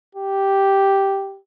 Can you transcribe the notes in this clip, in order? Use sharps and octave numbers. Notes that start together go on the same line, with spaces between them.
G4